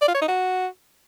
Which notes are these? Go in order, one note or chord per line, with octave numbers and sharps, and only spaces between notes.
D5
F4
C#5
D#4
F#4